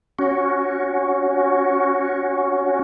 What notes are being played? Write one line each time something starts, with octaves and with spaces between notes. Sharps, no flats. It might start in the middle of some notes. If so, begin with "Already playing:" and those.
C#4 F#4